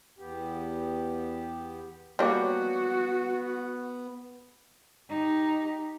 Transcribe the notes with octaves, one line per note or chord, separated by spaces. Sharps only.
E2 B3 G4
G3 A#3 B3 F#4 C#5 A5 D6
D#4 G4